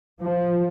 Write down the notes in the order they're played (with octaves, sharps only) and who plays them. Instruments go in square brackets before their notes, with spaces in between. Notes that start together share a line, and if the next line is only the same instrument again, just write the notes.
[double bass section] F3